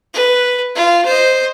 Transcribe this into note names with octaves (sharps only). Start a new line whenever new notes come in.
B4
F4
C5 D#5